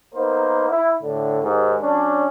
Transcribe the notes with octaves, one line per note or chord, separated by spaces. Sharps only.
A#3 B3 D#4 A#4 C5
E4
A2 D3
D#2 G#2
F#3 C#4 D4